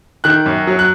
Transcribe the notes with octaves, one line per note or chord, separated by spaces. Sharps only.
D#3 F#6
F#2
F#3
F#6